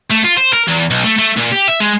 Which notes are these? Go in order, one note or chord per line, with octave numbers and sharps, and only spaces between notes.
A3
F4
C5
A#4
E2
B1
A3
A3
A#2
G4
E5
G#3